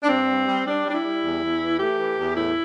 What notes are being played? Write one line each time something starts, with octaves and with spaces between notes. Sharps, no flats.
D4
G2 C4
G3
G3
G3 D4
G3 D4
E4
G3
E2
E2
E3
A3 G4
E3
E2
A2 E4